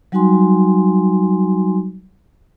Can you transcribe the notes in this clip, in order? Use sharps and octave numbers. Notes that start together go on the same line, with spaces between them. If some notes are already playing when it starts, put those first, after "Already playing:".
F#3 G3 D#4 F#4 G#5 C6